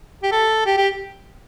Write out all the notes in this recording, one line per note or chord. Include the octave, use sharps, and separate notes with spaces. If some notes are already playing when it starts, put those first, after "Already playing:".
G4
A4
G4
G4